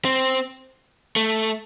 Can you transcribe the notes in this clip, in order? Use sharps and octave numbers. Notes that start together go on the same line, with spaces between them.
C4
A3